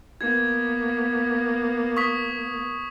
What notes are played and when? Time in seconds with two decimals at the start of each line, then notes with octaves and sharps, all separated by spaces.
0.21 A#3 B3 G#6
1.97 C#6 D#6 B6